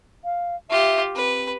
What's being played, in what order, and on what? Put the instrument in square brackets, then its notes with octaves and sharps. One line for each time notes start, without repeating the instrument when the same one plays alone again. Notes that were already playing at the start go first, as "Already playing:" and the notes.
[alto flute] F5
[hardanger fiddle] F4 G4 [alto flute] E5
[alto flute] C4 [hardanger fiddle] B4